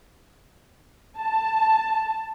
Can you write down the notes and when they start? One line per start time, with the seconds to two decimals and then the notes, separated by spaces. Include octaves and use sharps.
1.18 A5